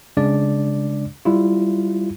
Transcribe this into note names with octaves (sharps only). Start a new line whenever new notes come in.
C#3 G#3 D4 D5
G3 E4 F4